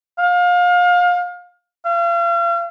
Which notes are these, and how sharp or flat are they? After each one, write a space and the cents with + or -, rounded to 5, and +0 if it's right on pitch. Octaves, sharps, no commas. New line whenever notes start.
F5 +30
F5 -40